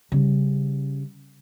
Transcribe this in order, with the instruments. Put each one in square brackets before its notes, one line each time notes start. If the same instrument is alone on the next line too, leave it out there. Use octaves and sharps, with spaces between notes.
[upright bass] C#3 G3